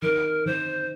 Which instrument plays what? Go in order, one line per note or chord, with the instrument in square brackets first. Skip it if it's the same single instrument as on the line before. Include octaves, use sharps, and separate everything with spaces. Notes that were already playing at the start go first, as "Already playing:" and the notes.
[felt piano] D#3 [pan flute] A#4
[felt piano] D#3 [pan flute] C5